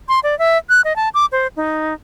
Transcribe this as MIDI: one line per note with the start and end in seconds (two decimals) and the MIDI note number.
0.09 0.20 84
0.23 0.37 74
0.39 0.58 76
0.69 0.81 90
0.84 0.96 75
0.96 1.09 81
1.14 1.26 86
1.32 1.47 72
1.56 1.94 63